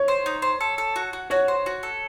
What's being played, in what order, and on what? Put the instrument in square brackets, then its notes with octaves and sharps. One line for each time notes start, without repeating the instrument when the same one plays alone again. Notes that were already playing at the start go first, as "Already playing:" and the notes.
Already playing: [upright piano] C#5
[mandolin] C5
D#4
C5
A4
A4
F#4
F#4
[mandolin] F#4 [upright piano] C#5
[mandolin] C5
F#4
A4